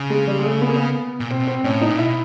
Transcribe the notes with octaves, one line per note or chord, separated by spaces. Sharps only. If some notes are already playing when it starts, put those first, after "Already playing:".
Already playing: C#3
G#3
G3
G#3
A3
B3
A#3
B3
A#2
B2 C4
C4
A2 C#4
D#4
A#2
B2 E4